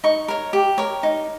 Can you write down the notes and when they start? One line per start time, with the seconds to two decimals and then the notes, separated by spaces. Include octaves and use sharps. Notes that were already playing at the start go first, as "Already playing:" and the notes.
0.04 D#4 C#6
0.28 A#4 C#5
0.53 G4
0.78 A#4 C#5
1.03 D#4